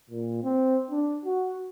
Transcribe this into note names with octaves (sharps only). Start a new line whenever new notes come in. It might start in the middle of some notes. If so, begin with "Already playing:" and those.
A#2
C4
D4
F#4